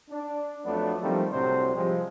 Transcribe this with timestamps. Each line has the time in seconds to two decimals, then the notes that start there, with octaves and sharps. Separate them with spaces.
0.10 D4
0.65 F2 F#3 A3 B3 D4
1.02 D#3 F3 G3 A3 A#3 C4
1.32 C2 A2 C3 F#3 D4 C5
1.75 C3 F3 G3 G#3 C4